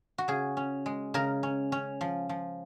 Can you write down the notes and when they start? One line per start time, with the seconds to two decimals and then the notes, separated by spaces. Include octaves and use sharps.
0.18 F#4
0.28 C#3 G#4
0.57 C#4
0.86 G#3
1.14 C#3 A#4
1.43 C#4
1.72 C#4
2.01 F3
2.29 F3